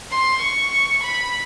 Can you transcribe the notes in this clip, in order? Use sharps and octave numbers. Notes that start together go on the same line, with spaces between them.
C6
C#6
B5